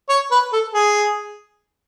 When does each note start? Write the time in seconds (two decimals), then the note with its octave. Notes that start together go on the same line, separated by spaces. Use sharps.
0.09 C#5
0.31 B4
0.53 A4
0.74 G#4